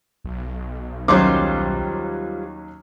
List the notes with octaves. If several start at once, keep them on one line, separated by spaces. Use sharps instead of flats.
B1
D#2 F#3 G3 C#4 F4 C5 C#5 D6